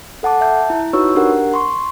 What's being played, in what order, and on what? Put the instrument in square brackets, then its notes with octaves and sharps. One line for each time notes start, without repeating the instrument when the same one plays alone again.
[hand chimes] A4 F#5 A5 D6
E5 A5 G6
E4
D#4 F#4 B4 C#5 C#6 E6
D4 G4 A#4 F#5
C6 C#6